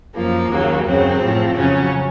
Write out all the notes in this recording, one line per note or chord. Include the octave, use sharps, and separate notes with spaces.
F#2 F3 A#3
D#2 C#3 F#3
F#2 C#3 F#3 C4
A2 F3
F2 C#3 F#3 C#4